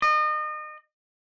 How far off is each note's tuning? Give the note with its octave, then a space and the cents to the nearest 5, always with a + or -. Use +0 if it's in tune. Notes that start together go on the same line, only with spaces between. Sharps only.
D#5 -35